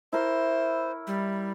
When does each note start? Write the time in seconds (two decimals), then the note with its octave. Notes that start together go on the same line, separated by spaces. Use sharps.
0.13 E4 A#4 C5 C#5
1.07 G3